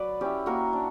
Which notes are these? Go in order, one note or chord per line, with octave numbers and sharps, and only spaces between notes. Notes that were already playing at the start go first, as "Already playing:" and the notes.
Already playing: F#3 B4 D5
C#4 E4 G4
A#3 F#4 A#4
D4